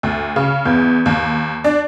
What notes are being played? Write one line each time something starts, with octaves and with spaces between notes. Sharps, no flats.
D2
C#3
E2
D#2
D4